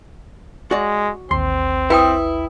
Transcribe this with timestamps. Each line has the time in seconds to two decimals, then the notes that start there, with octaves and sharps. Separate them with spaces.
0.71 G#3 F#4 D5
1.31 A1 D#2 C4 C6
1.90 E4 B4 G5 D#6